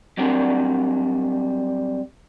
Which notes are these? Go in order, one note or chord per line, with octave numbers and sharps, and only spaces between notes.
F#3 G3 C4 D4 A#4